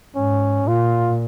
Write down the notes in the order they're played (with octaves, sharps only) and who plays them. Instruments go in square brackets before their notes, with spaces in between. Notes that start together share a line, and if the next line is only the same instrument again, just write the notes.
[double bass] G#2 [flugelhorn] C#4
[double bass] A#2 [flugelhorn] F4